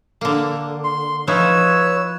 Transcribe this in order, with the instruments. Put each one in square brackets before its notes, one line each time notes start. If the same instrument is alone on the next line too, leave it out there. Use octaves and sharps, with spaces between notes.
[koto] D3 A#3
[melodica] C6
[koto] F3 D#4 E4 [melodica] B4 C#5 E6